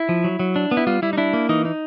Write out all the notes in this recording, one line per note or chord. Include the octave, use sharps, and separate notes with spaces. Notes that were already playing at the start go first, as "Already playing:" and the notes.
Already playing: E4
F3
F#3
F#3
D4
B3
E4
G3 F4
G3 E4
D#4
D4 E4
A#3
E3 D#4
D#4